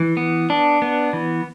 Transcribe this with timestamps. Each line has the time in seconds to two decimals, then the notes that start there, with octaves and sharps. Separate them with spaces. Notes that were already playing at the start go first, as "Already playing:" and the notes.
Already playing: E3
0.17 B3
0.50 D4
0.82 B3
1.13 E3